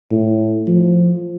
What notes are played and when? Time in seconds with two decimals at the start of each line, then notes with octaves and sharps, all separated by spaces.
0.11 A2
0.68 F3